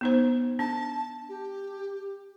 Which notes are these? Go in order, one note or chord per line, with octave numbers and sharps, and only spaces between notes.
B3 D#4 C5
D4 A5
G4